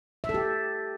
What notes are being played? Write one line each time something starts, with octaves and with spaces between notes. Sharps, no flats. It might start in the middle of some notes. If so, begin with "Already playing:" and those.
E5
A4
G4